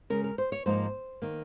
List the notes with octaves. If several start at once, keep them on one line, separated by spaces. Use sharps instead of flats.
C#3 G#3 C#4 A#4
A#4
C5
C#5
G#2 F3 A#3 D#4 C5
D#3 A#3